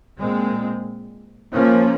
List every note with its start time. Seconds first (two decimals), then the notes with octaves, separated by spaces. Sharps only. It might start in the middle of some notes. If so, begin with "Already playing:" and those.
0.18 A#2 G#3 C4
1.52 F3 A#3 C#4